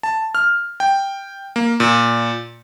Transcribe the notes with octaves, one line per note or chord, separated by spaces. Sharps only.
A5
F6
G5
A#3
A#2